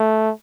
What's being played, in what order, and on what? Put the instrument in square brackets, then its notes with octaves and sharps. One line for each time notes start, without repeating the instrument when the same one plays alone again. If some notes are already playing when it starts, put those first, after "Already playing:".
Already playing: [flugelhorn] A3